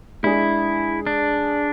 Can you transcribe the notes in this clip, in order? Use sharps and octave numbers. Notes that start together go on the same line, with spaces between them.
G#3 D4 E4 G#4
D4